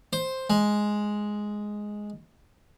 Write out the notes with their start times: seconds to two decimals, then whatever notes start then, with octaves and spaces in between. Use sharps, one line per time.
0.13 C5
0.50 G#3